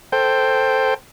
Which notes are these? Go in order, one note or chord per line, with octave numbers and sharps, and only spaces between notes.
A4 C5 G5